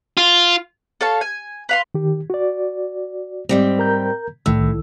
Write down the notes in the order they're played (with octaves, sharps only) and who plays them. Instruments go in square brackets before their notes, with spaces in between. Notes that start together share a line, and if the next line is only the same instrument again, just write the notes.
[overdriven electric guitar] F4
[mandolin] A4 C#5 F5 A5
G#5
B4 F5 C6
[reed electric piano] D#3 G4
F#4 D5
[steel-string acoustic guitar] G#2 G3 C4
[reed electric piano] A#4 A#5 G6
[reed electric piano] C2 D#3 E6 [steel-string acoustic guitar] A2